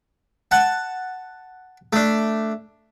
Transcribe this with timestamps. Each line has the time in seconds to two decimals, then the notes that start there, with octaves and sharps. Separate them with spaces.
0.51 F#5 A5
1.93 A3 D4